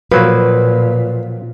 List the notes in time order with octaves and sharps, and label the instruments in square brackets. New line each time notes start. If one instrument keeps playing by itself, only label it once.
[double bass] A#2 [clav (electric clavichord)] F3 F#3 A#3 [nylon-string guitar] B4